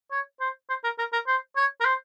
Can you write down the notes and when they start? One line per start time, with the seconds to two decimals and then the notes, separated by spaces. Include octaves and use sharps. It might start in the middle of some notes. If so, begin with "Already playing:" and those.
0.11 C#5
0.40 C5
0.69 C5
0.84 A#4
0.98 A#4
1.13 A#4
1.27 C5
1.56 C#5
1.80 A#4
1.85 C5